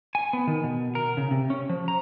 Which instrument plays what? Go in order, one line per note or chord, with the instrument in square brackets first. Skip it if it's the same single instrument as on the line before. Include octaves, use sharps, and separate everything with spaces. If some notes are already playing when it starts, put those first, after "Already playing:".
[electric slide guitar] G#5
B3
D#3
B2
A#4
C#3
C3
C#4
F3
A#5